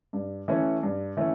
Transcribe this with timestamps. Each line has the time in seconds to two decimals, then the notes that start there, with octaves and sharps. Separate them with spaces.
0.13 G2
0.48 E3 A3 C#4
0.83 G2
1.17 E3 A3 C#4